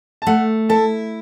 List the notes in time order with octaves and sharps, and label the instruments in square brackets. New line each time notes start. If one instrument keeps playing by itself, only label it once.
[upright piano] A5
[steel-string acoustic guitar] A3 [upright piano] F#5
[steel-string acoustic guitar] E4 [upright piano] A4 A5